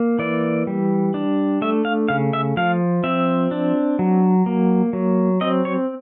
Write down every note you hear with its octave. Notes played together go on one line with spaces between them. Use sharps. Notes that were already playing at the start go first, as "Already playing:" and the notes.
Already playing: A#3
E3 D5
G3
D4
A3 E5
F5
C#3 F5
E5
F3 F5
C4 E5
D4
F#3
A#3
F#3
C4 D#5
C#5